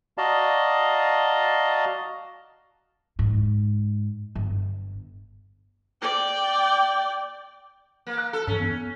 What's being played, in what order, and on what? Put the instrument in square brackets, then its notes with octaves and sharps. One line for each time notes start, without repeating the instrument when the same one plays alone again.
[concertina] F#4 D5 D#5 F5 A5 A#5
[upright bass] G#2
G1
[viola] D5 G5
[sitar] A#3
[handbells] F#6
[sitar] A4
[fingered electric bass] G2 E3 [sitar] C#4
[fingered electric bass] B3